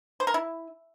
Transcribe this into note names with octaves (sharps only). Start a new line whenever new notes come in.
C5
A#4
E4